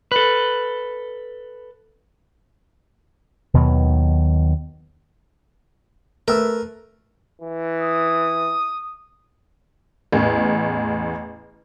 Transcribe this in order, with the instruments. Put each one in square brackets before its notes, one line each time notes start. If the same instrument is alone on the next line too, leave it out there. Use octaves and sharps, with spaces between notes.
[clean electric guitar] A4 B4
[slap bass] D#2 B2 D#3 F#3
[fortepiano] A3 B4 E6 [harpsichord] A#4
[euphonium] E3
[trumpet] D#6
[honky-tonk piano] A1 E2